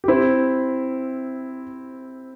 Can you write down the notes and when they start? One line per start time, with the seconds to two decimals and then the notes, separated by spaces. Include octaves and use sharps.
0.04 G4
0.08 C4 E4